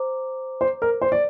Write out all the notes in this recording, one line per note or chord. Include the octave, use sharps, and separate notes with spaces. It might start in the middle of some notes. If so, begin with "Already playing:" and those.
Already playing: C5 A#5 D6
C5
A#4
C5
D5